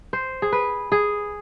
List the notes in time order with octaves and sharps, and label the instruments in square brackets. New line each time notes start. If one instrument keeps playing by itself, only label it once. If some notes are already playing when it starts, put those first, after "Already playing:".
[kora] C5
G#4
B4
G#4